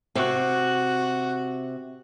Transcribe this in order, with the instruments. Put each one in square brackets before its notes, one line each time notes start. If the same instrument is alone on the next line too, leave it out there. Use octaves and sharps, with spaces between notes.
[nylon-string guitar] C3 [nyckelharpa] F#4